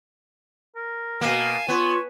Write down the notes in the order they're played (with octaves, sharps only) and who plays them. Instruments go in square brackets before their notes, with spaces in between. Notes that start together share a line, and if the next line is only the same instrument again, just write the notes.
[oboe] A#4
[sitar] B2 A#3 [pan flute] F5 [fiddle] G#5 A5
[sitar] B3 [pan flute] F4 [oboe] C#5